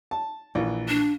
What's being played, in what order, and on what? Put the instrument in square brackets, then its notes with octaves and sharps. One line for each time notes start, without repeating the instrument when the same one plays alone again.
[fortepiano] A5
A#1 E3
[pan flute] D4